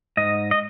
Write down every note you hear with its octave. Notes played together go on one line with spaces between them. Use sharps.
G#2 D#5
D#5